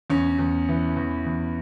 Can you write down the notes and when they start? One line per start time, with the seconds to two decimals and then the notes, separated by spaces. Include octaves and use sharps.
0.10 E2 C#4
0.39 E2
0.69 E3
0.97 E2
1.26 E2